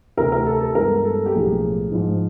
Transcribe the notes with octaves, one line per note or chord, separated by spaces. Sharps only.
D2 C3 E3 A#4
A#4
A4
A4
G2 E3 G#3 B3 A#4
A4
G4
B1 A2 F3 A#3 C#4 G#4
G#2 F3 G#3